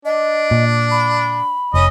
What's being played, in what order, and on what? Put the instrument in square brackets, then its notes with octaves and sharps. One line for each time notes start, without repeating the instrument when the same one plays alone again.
[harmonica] D4 [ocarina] D#5
[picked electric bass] A#2
[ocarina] B5
[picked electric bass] F1 [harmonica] C#4 D#5